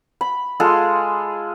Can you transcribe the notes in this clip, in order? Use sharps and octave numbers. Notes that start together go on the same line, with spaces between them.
B5
G#3 F4 G#4 A4